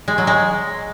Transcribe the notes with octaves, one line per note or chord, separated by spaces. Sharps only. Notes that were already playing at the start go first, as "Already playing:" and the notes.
G#3
F#3
G#3